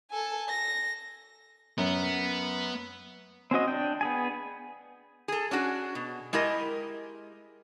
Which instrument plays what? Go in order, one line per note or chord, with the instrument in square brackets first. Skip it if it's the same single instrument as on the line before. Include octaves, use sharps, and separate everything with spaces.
[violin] A4 G#5
A#6
[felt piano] F#2 [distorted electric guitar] B3
[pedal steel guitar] C4 C#4 F#4 D#5
D4 G5
B3 G#4 G#5
[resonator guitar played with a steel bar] G#4 A4
C#4 D4 F#4 G#4
B2
G#3 E4 G4 A#4 D#5